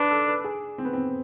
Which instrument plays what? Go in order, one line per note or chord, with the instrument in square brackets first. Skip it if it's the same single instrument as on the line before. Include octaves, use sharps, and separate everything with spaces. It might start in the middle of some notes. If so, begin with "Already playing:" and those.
Already playing: [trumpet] D4 [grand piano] B4
[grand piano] A4
B4
G#4
C4
B3
C4